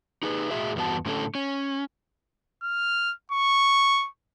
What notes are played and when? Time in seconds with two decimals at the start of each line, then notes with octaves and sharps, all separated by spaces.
0.23 D#4 G#4 B4
0.51 A2 F#4 G#4 E5
0.76 E2 G2 B3 F#4 A5
1.06 A2 D3 A3 C#4 A4
1.35 C#4
2.63 F6
3.31 C#6